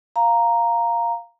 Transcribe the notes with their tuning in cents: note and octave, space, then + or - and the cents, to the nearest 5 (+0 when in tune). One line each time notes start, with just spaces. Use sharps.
F5 +0 A#5 +0